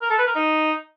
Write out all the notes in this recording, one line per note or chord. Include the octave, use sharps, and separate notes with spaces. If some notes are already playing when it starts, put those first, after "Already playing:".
A#4
A4
B4
A#4
D#4